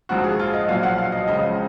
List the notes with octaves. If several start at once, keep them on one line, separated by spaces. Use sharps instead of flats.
A#1 G#2 F3 F#4
G#4
F4
D#5
B1 A#2 F3 F5
F#5
F5
D#5
C#2 C#3 F3 D#5